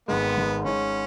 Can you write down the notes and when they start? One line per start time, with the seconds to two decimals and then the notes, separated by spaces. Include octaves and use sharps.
0.08 G#1 G#2 G#3 B3
0.37 G#1 G#2 G#3
0.65 G#2 G#3 C#4 D#4